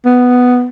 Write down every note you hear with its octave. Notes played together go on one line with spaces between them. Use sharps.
B3